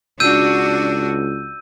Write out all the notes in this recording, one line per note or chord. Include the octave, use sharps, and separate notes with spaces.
C#2 D4 F#4 E6 G6 D#7